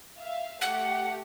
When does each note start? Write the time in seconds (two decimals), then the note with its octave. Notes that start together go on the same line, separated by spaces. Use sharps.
0.18 E5 F5
0.61 A3 G4 F#5